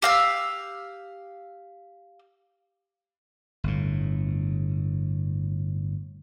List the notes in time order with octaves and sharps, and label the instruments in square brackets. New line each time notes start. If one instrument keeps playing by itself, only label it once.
[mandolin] G4 F5 E6
[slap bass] G1 A2